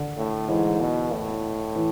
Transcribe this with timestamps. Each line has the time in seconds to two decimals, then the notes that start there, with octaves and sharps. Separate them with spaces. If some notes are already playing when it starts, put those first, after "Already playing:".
Already playing: D3
0.18 A2
0.49 G#2 E3
0.80 B2
1.13 A2
1.76 E3